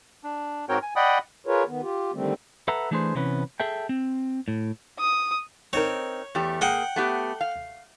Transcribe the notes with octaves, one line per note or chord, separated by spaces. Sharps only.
D4
G#2 C4 F#4 A#4 C#5 G5
G#5
D5 D#5 F#5 G5 B5 D#6
F4 G#4 A#4 B4 C#5
D#3 B3
F4 G4
D3 D#3 G3 A3 C4
A4 B4 E5 F#5 A#5
E3 A3 D4 G#4 B4 C5
C3 E3 B3 C#4 B4
G#4 A4 E5 G5
C4
A2
D#6
C4 D#4 A#4 C#5
E2 A3 G4
A#3 G#4 F#5 G5
A3 B3 G4
F5